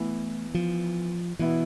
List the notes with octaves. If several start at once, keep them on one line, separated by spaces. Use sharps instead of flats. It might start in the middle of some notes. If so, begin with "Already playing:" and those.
Already playing: E3 A3 B3 E4
F3
B2 E3 B3 E4